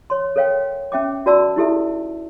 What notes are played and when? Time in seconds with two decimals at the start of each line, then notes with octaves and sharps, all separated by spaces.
0.10 C#5 C6
0.36 A4 A#4 C#5 F5 G5
0.92 C#4 E5 G5 D6
1.26 F#4 A#4 D5 A5 C6 E6
1.56 D#4 E4 G4 A4 E5